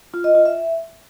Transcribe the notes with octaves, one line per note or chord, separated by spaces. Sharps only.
F4
D#5
F4
E5